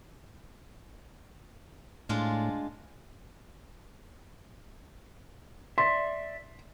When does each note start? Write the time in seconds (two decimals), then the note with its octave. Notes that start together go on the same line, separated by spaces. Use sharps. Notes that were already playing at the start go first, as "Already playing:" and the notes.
2.09 A2 G#3 D4 F4
5.78 D5 E5 C6